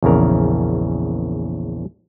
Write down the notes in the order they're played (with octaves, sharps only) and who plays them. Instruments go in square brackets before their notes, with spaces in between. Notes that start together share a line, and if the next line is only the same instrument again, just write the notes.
[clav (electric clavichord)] A#1 E2 C#3 A#4